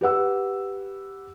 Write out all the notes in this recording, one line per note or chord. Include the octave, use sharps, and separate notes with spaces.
G4 B4 F#5 E6